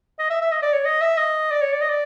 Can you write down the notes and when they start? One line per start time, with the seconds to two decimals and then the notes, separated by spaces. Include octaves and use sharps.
0.19 D#5
0.30 E5
0.41 E5
0.52 D#5
0.62 D5
0.73 C#5
0.85 D#5
1.01 E5
1.17 D#5
1.51 D5
1.62 C#5
1.73 D5
1.81 D#5
1.89 D5